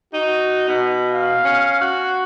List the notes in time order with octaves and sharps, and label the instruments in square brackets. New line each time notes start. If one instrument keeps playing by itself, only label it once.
[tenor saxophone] D#4 [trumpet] F#4
[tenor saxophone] B2
[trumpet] F5
[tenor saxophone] C#4
F#4